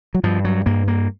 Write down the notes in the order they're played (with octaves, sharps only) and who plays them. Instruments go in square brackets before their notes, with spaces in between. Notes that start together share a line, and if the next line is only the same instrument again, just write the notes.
[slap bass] F#3
G2 F3
F#3
G2 A#3
A#3